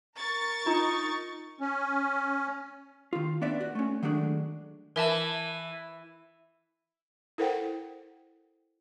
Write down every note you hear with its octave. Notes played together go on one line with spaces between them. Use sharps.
A#4 C#6 A6
D4 D#4 F4 A#5
C#4
D#3 F4
B3 C#4 D4 D5 E5
F#4
A3 C#4
D#3 F#3 G#3 A3 D4
E3 A#4 E5 A5
E4 A4 A#4 C5 F#5 G5